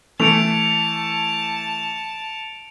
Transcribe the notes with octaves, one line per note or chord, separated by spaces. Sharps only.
E3 A3 A5 C#7 D7 F7